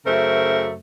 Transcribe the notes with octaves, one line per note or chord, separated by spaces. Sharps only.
F#2 C#3 A3 A#4 C5 E5